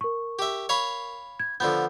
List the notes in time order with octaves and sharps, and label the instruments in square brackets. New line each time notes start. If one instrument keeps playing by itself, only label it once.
[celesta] A#4 C#6
[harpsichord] G4 E5
C#5 F5 B5
[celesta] G#6
[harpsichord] D3 F3 B3 [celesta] F#5 G6